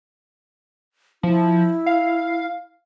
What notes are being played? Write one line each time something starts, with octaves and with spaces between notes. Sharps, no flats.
F3 E4
F5